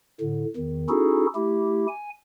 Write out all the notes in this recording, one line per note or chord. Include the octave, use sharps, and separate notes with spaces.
A2 D3
E2 D#3
C#4 D#4 E4 F#4 G#4 A4
A3 E4 G4
G#5